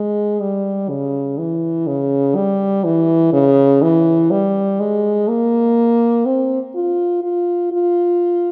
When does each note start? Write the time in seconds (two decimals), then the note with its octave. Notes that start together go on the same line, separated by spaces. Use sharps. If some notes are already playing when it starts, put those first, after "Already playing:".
Already playing: G#3
0.41 G3
0.89 C#3
1.38 E3
1.87 C#3
2.36 G3
2.84 E3
3.33 C#3
3.82 E3
4.31 G3
4.80 G#3
5.28 A#3
6.26 C4
6.75 F4
7.24 F4
7.72 F4